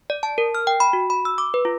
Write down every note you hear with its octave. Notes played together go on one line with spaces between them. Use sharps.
D5
A5
A#4
F6
G5
B5
F#4
B5
E6
D6
B4
F4